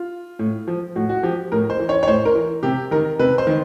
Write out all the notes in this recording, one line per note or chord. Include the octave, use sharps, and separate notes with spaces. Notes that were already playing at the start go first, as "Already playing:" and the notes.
Already playing: F4
A2
F3
A2 F#4
F#4
F3 G4
A2 A#4
C5
E3
C#5
C#5
A2 C5
A#4
E3
C3 G4
D#3 A#4
C3 B4
C5
D#3